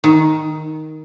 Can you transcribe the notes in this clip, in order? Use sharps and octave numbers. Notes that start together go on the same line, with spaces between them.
D#3